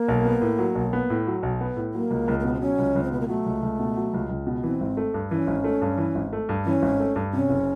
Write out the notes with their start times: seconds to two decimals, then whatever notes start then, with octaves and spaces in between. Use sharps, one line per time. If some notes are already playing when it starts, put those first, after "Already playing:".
Already playing: A#3
0.08 B1
0.25 B3
0.42 A2
0.59 F#3
0.75 B1
0.93 B3
1.10 A2
1.27 F#3
1.43 B1
1.61 B3
1.76 A2
1.94 F#3 A#3
2.11 C#2
2.28 C#2
2.39 A#3
2.44 B2 B3
2.54 C4
2.61 F#3 C#4
2.79 C#2
2.95 C#2
3.03 C4
3.12 B2 B3
3.21 A#3
3.28 F#3 A3
3.46 C#2
3.63 C#2
3.79 B2
3.97 F#3
4.14 C#2
4.29 C#2
4.47 B2
4.64 E3 C4
4.80 G#1
4.97 A3
5.14 G2
5.30 E3 C#4
5.47 G#1
5.64 A3
5.82 G2
5.98 E3
6.15 G#1
6.33 A3
6.49 G2
6.65 E3 C#4
6.82 G#1
7.00 A3
7.16 G2
7.33 C3 C#4
7.50 F#1